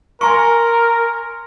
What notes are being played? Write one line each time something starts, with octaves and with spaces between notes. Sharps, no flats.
A#4 G#5 A#5 C6 C#6